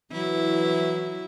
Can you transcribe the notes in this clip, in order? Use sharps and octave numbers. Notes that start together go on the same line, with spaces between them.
E3 F#3 E4